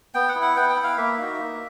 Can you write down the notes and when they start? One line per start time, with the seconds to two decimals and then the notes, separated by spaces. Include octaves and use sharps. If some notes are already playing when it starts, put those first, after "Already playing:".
0.14 B3 G5
0.29 F#5
0.35 E4
0.42 F#5
0.56 B3 G5
0.70 G5
0.76 E4
0.83 F5
0.97 A#3 E5
1.18 D#4 F#4
1.39 A#3